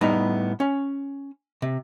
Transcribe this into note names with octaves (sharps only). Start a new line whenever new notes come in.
A2 G3 B3 D#4 A#5
C#4
C3